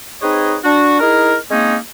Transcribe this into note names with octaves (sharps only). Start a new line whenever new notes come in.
C4 D#4 G#4 B4 C#5 D#5
D4 F#4
D#4 E4 G#4 A#4
G#3 A#3 C4 C#4 D#4 G#4